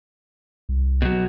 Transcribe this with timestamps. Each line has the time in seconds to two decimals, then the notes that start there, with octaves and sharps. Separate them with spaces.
0.69 C2
1.02 B2 F#3